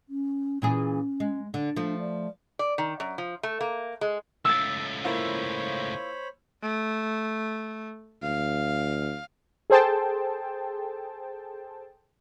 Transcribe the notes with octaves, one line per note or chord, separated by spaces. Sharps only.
C#4
A#2 E3 C#4 G#4
G#3
D3 D4
F3 A3
D5
D5
D#3
F#2
F3
A3
A#3
G#3
C#2 A2 E6 A6
A#3 E4 F4 C5 C#5 B5
A3
D2 F5
G#4 A4 C5 G5 A5